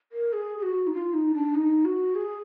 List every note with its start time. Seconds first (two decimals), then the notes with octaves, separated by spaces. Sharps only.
0.12 A#4
0.33 G#4
0.58 G#4
0.63 F#4
0.87 D#4
0.94 F4
1.14 D#4
1.34 D4
1.55 D#4
1.85 F#4
2.15 G#4